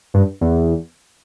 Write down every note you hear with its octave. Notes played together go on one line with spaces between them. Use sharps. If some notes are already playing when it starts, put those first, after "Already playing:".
G2
E2